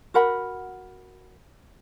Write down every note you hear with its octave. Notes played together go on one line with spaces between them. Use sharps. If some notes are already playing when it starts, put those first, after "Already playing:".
F#4 A#4 F#5 B5